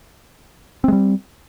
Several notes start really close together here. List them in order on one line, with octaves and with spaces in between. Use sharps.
C4 G#3 G3